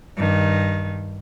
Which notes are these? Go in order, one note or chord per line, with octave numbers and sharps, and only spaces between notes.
G2 D#3